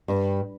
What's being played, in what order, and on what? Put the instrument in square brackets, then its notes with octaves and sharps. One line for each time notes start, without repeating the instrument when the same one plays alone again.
[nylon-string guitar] G2